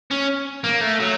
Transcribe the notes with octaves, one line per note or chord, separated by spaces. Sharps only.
C#4
A#3
A3
F#3